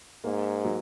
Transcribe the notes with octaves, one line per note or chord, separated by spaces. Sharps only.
G#2 A#3
F#3